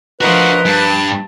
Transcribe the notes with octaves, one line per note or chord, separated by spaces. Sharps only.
F3 D4 F#4 A#4 B4 D#5
G2 A5